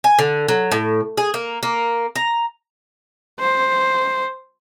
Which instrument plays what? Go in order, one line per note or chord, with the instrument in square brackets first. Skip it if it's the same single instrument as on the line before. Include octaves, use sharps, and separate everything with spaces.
[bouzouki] G#5
D3
F#3
A2
G#4
A#3
A#3
A#5
[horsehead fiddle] C5